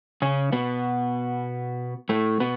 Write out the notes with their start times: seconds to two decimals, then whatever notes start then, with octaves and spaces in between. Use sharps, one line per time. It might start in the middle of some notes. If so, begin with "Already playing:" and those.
0.22 C#3 C#4
0.52 B2 B3
2.09 A2 A3
2.40 B2 B3